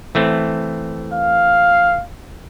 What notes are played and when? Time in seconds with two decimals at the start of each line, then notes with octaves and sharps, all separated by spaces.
0.15 E3 A3 C4
1.13 F5